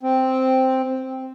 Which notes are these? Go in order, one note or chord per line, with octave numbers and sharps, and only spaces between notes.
C4